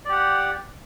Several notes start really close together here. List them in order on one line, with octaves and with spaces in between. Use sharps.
D5 G4 F#5